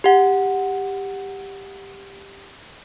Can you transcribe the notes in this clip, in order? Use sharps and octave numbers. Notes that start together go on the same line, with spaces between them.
G4 F#5